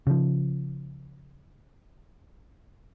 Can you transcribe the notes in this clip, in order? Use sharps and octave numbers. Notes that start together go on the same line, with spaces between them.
C#3 F3